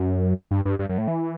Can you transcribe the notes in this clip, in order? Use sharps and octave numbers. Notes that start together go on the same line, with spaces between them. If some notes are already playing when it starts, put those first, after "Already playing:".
Already playing: F#2
G2
G2
G2
F#2
A2
E3